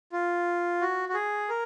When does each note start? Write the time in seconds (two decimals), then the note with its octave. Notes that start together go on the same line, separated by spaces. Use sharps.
0.13 F4
0.81 F#4
1.09 F#4
1.14 G#4
1.49 A#4